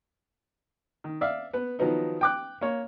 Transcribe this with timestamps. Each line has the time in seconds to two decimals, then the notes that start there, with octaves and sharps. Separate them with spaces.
1.04 D#3
1.21 D5 E5 F5
1.53 B3 B4
1.79 D#3 F3 F#3 B3 D#4
2.21 G5 D6 F#6
2.61 A#3 C#5